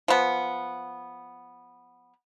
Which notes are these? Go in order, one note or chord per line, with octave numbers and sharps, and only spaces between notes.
F3 B3